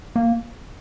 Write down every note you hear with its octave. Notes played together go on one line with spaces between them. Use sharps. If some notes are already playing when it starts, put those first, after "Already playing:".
A#3